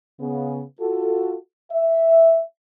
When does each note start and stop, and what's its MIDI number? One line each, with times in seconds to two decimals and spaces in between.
0.21 0.63 49
0.21 0.63 59
0.80 1.37 65
0.80 1.37 66
0.80 1.37 69
1.72 2.43 76